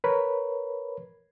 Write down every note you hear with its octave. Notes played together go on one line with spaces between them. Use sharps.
A#4 B4 C#5 B5